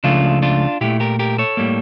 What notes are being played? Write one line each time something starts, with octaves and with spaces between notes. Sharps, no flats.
C#2 C#3 F3 A3 D4 F4
D4 F4
A#2 A3 E4 G4
G4 A#4
G4 A#4
A4 C#5
A2 G3 A#3